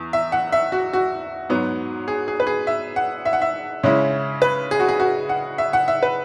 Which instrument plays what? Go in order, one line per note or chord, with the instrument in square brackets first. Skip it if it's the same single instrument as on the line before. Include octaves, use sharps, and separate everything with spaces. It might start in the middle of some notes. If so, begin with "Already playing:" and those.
Already playing: [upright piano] E2
E5
F#5
E5
F#4
F#4
G#2 F#3 B3
G#4
G#4
B4
G#4
E5
F#5
E5
F#5
E5
C#3 G#3 C#4 E4 C#5
B4
G#4
F#4
G#4
F#4
F#5
E5
F#5
E5
B4